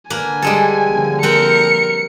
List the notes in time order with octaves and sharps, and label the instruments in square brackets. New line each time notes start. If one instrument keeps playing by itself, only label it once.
[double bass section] D3 [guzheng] A#3 B4 [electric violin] G#5
[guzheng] G3 G#3 A4
[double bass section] D3 F3 A#3
[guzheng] C4 B4 G5 [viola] A#4 [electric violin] C#7